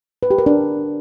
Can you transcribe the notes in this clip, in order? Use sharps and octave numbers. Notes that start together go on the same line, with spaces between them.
B4
G4
A#4
D4